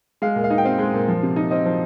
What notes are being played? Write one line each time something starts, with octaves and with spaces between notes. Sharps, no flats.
G#3 F5
A#2
F5
D#4
G5
C4 F5
G#3
A#2
F3
C3
D#4
C4 D#5
F3